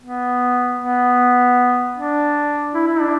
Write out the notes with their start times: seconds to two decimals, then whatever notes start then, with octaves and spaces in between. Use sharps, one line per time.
0.02 B3
0.79 B3
1.96 D4
2.74 E4
2.87 E4
3.01 D4